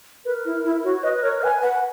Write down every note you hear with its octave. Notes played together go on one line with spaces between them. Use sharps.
A#4 B4
E4
E4
F#4 C#5
B4 D#5
A#4 C#5
B4 G#5
B4 F#5